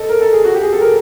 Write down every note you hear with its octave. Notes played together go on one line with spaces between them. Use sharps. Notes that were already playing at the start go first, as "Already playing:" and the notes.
Already playing: A4 D#5
A#4
A4
G#4
F#4
G4
G#4
A4
A#4